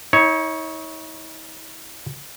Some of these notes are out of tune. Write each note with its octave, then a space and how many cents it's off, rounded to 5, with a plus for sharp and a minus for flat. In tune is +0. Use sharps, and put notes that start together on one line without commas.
D#4 +45 C#5 +0